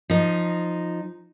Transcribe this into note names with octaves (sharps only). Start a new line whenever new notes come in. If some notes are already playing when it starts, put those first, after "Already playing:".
F3 D#4